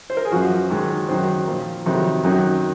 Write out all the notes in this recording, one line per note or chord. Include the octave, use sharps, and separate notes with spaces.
C5
A#4
G#4
F#2 F3 F#4
G#2 D#3 F#3
F#2 D#3 F#3 C5
A#2 F3
F2 C3 D#3 F#3
F#2 D#3 F#3